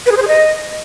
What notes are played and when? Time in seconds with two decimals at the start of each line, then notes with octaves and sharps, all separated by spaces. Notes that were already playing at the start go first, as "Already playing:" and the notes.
0.06 B4
0.12 G#4
0.17 C5
0.22 G#4
0.28 D#5